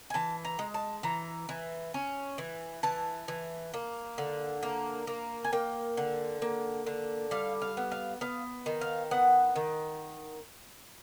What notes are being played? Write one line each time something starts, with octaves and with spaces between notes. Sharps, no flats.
G#5
E3 A5
A#5
G#3
A5
E3 A#5
E3
C#4
E3
E3 A5
E3
A#3
D3
A#3
A#3
G#5
A#3 G5
D3
A#3
D3
G3 F5
F5
B3
F5
B3 F5
D#3
F5
B3 F#5
D#3